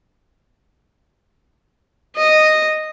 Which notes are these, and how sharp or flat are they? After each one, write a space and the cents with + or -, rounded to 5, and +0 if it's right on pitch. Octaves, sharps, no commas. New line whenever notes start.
D#5 -5